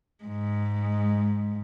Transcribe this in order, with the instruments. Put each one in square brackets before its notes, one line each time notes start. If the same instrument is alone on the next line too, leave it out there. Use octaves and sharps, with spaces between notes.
[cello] G#2 G#3